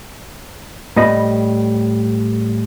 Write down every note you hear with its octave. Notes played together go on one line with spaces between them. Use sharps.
A2 G3 D#5 B5